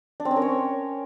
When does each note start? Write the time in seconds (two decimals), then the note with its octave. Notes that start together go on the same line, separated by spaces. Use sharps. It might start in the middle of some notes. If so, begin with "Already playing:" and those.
0.20 D4
0.25 C4
0.31 C#4
0.36 A#4
0.42 C#5